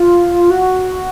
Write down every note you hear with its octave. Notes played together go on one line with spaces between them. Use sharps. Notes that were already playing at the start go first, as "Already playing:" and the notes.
Already playing: F4
F#4